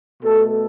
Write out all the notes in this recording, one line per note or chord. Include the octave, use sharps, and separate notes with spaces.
B2 A3 A4